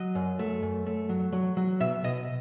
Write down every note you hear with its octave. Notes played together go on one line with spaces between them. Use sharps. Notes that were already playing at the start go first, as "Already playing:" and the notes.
Already playing: F#3 D#5
F#2
A3
F#2
A3
F#3
F#3
F#3
B2 E5
B2 D#5